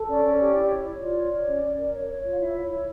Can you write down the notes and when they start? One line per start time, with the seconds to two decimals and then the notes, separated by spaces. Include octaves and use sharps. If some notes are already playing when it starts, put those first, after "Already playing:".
Already playing: A4
0.08 C#4 D5
0.24 C#4
0.39 G4
0.55 E4
0.70 C#5
0.85 C#5
1.01 F4 D5
1.17 C#5
1.32 C#5
1.48 C#4
1.63 C#4
1.78 A#4
1.94 C#5
2.09 C#5
2.24 F4
2.31 F5
2.40 E4 E5
2.55 C#5
2.71 E4